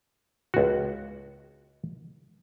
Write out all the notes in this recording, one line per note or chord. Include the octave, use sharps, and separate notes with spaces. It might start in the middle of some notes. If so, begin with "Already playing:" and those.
C#2 F#4